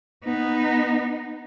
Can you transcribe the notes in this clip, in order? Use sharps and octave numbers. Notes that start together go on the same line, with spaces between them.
B3 D#4